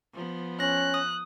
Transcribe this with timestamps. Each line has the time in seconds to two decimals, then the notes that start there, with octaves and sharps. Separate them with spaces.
0.13 F3 B3
0.60 C#4 F#6 A#6
0.94 D#6